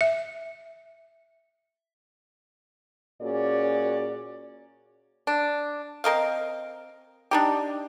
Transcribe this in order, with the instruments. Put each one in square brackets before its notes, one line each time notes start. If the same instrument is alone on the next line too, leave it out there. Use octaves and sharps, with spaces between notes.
[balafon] E5
[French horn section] A#2 C#4 F#4 G#4 D5
[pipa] D4
C4 A#4 D#5 F5
D4 D#4 G4